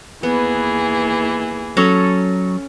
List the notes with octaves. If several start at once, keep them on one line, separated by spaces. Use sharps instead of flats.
D#2 E3 B3 G#4
F#3 C#4 A4 A#5